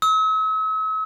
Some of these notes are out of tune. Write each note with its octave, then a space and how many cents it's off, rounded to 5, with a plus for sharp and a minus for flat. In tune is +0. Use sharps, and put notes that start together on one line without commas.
E6 -45